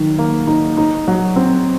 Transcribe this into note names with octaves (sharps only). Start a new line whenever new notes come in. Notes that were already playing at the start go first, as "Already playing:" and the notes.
Already playing: D#3 F#3
A#3
D#4
D#4
F#3
C4